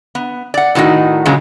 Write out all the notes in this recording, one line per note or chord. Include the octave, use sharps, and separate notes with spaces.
B3
D5 F#5
A2 D#3 G3 A#3 D#4 F#4
A#2 C#3 F#3 G#3